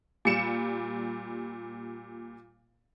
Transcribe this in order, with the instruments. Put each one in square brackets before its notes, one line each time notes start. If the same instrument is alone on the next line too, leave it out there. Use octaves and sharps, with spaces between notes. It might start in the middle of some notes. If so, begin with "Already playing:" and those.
[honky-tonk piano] A#2 G3 C#7 E7